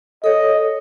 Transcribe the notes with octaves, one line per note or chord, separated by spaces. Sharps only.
A4 C#5 D#5